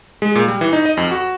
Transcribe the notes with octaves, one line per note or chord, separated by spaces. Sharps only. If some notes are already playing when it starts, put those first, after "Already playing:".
G#3
A#2
G3
E3
D#4
D#5
F2
F#4